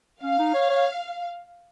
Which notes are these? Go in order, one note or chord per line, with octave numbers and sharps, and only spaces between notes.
C#4 F5
D#4
C#5
C#5